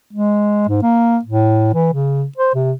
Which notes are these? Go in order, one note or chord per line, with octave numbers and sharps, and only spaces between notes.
G#3
G#2
A#3
A2
E3
C#3
C5
C3